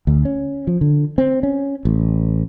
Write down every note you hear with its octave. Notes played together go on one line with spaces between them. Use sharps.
D2
C#4
F3
D3
C4
C#4
A1